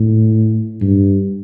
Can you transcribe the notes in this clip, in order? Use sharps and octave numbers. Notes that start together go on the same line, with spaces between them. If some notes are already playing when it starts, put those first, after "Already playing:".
Already playing: A2
G2